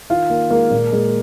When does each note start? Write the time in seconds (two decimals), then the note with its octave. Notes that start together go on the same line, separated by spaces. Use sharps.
0.10 D#3 F4
0.30 D#3 A#3
0.50 G#3 A#3
0.71 A#2
0.92 G#3